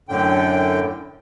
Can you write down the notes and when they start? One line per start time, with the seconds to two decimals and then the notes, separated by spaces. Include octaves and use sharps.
0.09 F#2 A2 D3 G5